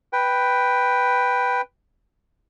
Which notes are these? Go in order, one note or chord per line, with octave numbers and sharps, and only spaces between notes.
B4 G5